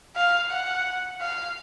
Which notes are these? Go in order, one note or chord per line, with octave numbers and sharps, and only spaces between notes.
F5
F#5
F5